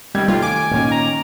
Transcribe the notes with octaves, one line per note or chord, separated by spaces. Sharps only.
C3 D#3 G3 G#6
D#2 A3 F4 G4
G#5 D6
A#2 D#3 A#3 C#4
A#5